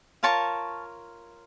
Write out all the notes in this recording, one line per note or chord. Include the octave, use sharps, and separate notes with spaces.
F4 A#4 C#5 A5 C#6